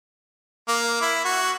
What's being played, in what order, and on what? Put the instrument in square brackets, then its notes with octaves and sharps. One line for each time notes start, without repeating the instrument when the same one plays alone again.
[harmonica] A#3
E4
F#4